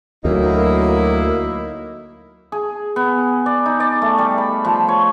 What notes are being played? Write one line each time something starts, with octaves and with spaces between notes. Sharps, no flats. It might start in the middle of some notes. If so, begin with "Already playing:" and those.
D2 F#3 A#3 D#4 E4
G#4
B3
D5
D#4
D5
A3
G3
B5
F3
C#5